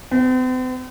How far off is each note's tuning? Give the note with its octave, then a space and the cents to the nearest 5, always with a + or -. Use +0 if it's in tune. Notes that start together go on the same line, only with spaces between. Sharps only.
C4 -45